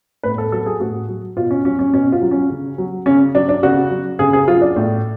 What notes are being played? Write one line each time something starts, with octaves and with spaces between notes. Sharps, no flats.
A2 B4
A4
F#3 A4
G#4
A2 F#4
F#3
B2 F4
C#4
F#3 C#4
C#4
B2 C#4
F4
F#3
C#4
C#3
F#3
C#3 C#4
F#3 D4
D4
C#3 F#4
F#3
C#3 G#4
G#4
F#3 F4
D4
A2